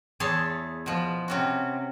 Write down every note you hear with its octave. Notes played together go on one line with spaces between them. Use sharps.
E2 G#4 C#5 E5 A5 C6
B2 F3
C3 C#4 F#4